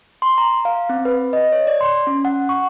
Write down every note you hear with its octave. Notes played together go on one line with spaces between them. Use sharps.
C6
A#5
F5
C4
B4
D#5
C#5
D5
C6
C#4
F#5
C#6